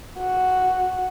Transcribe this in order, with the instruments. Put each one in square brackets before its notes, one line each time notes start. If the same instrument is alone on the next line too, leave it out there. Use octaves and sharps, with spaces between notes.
[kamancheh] F#4